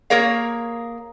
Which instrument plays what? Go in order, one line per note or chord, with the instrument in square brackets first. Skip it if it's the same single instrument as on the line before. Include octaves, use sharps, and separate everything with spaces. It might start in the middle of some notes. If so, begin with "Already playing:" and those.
[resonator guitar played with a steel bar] A#3 G#4 A#4 C#5 F5